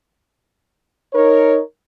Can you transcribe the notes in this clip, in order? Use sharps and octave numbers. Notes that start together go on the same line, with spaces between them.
D#4 A#4 C#5